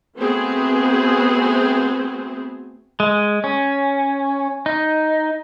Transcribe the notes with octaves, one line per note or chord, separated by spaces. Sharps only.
A3 B3 C4 F#4 G#4
G#3
C#4
D#4